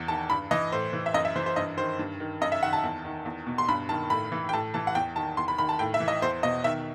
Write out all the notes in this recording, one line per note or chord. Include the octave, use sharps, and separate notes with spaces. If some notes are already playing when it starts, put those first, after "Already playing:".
Already playing: E2 E3
D#3 A5
G2 B5
E3 D#5
A2 C5
E3
E5
F#2 D#5
E5
E3 C5
C5
G2 D#5
D#3 C5
G2
D#3
F#2 D#5
E5
D#3 F#5
A5
E2
D#3
E2
B2
C6
G2 B5
D#3 A5
A2 B5
E3
G5
A2 A5
E3 A5
F#5
E2 G5
D#3 A5
E2 C6
B5
D#3 B5
A5
A2 G5
E5
E3
D#5
E2 C5
B2 D#5
D#3 E5